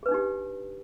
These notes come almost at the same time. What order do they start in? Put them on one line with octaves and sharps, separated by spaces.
G#4 B4 D4 D#4 G4